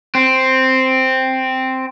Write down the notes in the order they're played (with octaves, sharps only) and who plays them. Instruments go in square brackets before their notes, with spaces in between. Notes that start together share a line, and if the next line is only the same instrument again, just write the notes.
[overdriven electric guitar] C4